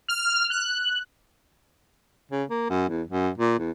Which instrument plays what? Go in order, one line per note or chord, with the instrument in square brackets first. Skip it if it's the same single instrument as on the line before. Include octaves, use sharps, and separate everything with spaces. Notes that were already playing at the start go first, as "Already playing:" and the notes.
[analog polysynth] F6
F#6
[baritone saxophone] C#3
A#3
F#2
E2
F#2
A#2
E2